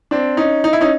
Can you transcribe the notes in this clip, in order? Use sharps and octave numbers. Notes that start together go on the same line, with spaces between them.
C4 D4
C#4 D#4
D#4
E4
C#4 D#4